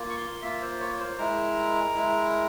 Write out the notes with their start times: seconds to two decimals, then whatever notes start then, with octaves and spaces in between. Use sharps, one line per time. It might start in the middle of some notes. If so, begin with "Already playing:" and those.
Already playing: A#3 F4
0.10 C#6
0.17 C6
0.42 A#3 F4 E5
0.61 C5
0.80 C#5
1.00 C5
1.18 G#3 E4 A#4
1.95 G#3 E4